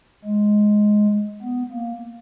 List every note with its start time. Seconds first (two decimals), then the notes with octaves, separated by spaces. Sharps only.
0.25 G#3
1.43 B3
1.71 A#3